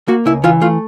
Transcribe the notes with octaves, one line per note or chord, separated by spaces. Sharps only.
A#3 F#4
C#2 E4
E3 F4
A3 F4